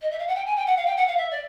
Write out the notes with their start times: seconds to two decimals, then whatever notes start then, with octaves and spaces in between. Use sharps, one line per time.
0.02 D#5
0.11 E5
0.19 F5
0.27 F#5
0.35 G5
0.46 G#5
0.56 G5
0.67 F#5
0.77 F5
0.86 G5
0.97 F#5
1.07 F5
1.17 E5
1.31 D5